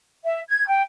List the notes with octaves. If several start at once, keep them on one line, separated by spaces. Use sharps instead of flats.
E5
G#6
G5